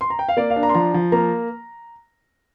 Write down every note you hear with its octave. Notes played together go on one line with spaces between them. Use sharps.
C6
A#5
G5
F5
A#3 D5
F5
D4
A#5
C6
F3 A#5
F3
A#3 A#5